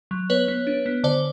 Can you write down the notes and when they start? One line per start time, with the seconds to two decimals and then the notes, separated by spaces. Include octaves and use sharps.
0.11 F#3
0.30 B3 B4 C#5
0.48 B3
0.67 D4
0.86 B3
1.04 D3 C5 D5